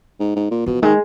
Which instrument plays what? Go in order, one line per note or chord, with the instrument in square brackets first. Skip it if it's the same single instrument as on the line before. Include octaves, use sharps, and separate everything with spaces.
[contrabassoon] G#2
G#2
A#2
[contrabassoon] B2 [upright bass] F3
[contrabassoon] D#3 [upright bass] G#3